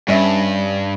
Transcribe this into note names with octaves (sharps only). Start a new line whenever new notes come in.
G2 G3 C#4 E5